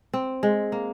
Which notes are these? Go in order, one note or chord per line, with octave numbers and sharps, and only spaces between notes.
C4
G#3
A#3